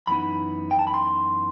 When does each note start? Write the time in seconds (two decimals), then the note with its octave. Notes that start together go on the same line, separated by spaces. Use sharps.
0.07 F#2 E3 B3 D#4 B5
0.71 G5
0.79 A5
0.87 B5
0.94 C6